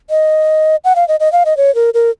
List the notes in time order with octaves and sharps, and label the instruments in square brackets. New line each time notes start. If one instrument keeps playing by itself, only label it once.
[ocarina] D#5
F#5
F5
D#5
D#5
F5
D#5
C#5
A#4
A#4